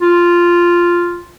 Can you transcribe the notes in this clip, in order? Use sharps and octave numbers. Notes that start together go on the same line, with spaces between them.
F4